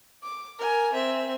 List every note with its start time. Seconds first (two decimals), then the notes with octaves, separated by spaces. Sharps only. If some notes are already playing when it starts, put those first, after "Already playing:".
0.23 D6
0.59 A#4 G#5
0.93 C4 E5